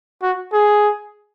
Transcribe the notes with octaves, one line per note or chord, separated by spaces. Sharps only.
F#4
G#4